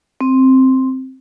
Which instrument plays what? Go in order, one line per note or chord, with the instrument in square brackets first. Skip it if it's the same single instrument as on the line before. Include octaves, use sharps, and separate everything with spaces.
[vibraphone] C4